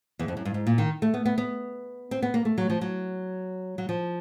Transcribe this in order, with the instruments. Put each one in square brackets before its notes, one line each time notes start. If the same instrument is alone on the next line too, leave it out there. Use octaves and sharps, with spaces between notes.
[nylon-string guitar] E2
F2
F#2
G2
G#2
A#2
D#3
A3
B3
B3
B3
C4
B3
A#3
A3
F#3
F3
F#3
F#3
F3